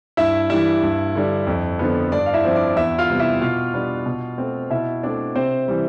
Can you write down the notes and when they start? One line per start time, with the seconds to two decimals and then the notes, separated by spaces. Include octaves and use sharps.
0.17 G2 E4 E5
0.50 E3 G3 D4 E4 E5
0.82 G2
1.15 D3 G3 D4
1.47 F2
1.79 D3 F3 B3
2.11 G2 D4 D5
2.26 F5
2.34 E4 E5
2.44 F3 C4
2.55 D4 D5
2.76 E2 E4 E5
2.98 F4 F5
3.09 C3 G3 B3
3.19 E4 E5
3.41 B2 F4 F5
3.74 G3 B3 D4
4.06 B2
4.38 A3 C4
4.70 B2 E4 E5
5.03 A3 C4 D4 D5
5.36 C3 C4 C5
5.68 E3 G3